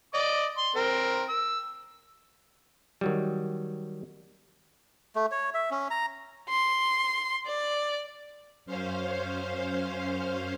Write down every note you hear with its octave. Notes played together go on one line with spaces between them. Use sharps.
D5 D#5 D6
C6
C4 A#4
E6
D#3 F#3 G3
A3
C#5
E5
C#4
A#5
C6
D5
F#2 C#4 C5 F5